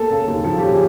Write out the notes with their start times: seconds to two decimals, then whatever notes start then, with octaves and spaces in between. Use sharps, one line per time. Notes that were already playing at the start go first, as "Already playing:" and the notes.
Already playing: A#3 A4
0.10 C#3
0.27 D#2
0.45 F3 A4
0.58 C#3 G4
0.71 G#4